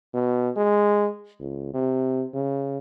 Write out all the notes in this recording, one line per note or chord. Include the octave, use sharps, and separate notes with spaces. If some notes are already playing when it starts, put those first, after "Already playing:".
B2
G#3
C#2
C3
C#3